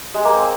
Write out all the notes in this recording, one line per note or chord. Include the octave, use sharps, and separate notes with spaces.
G#3
A#3
C4